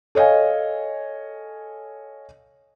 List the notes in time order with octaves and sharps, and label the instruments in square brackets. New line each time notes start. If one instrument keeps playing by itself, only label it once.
[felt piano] A4 C#5 D#5 F5 G#5